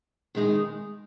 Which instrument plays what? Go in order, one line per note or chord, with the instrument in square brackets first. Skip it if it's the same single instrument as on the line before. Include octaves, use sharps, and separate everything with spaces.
[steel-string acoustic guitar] D#3 G#3 D#4 G#4